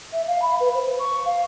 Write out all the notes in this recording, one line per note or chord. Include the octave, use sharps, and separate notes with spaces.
E5
F5
B5
B4
C5
C#6
F5